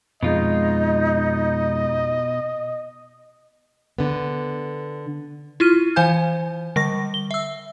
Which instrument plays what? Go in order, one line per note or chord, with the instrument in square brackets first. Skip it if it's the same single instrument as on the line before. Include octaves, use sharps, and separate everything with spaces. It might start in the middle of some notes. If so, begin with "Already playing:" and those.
[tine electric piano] F2 G#3 [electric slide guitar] B2 F4 [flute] D#4 [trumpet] D#5
[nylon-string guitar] D3 B3
[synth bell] E4 F4 F6 D#7
E3 C5 F5 G#5 G6
D3 G3 C#6 A#6
G7
E5 E6